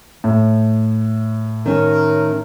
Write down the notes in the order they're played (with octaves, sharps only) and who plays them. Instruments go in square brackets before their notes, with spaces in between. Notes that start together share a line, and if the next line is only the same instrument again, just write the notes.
[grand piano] A2
[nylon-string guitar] D#3 C#4 [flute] A#4